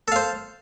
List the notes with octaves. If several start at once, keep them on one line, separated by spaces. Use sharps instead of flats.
A4 C5 F5